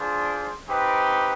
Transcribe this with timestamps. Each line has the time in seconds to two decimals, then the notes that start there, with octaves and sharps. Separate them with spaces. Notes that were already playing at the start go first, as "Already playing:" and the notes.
Already playing: D4 F4 G#4 C5
0.68 C4 D#4 G4 B4